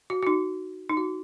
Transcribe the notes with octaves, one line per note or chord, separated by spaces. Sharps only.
F#4
F#4
D#4
D#4
F#4